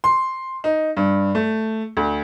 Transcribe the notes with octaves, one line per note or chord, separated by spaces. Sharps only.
C6
D#4
G2
A3
D2